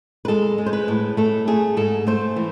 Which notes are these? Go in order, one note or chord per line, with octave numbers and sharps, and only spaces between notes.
B4
G#3 A4
G#3
C5
B4
A2
A3 A4
A3 G#4
G#2 A4
A3 C5
E3